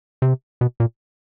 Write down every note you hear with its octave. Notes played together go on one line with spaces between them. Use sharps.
C3
B2
A#2